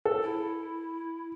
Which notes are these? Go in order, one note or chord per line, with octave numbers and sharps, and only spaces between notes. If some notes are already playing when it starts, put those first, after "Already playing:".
A4
E4